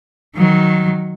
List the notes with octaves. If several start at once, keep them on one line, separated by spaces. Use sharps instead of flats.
D#3 F#3